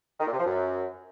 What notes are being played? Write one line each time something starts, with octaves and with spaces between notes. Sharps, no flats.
D#3
A#2
C3
F3
F#2